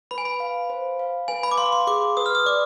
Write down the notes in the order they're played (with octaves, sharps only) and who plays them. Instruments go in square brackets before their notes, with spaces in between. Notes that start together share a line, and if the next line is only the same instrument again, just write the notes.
[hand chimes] B4 [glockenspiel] B5
[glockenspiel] G#5
B5
[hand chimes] F5
C5
F5
[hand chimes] B4 [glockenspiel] G#5
[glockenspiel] B5
D6
[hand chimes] F5 [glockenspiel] C6
[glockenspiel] C6
[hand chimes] G#4 [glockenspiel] D6
[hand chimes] B4 [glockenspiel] D#6
[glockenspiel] F6
D#6
[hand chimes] D5 [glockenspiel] D6